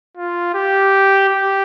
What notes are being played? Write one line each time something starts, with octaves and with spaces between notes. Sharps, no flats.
F4
G4
G4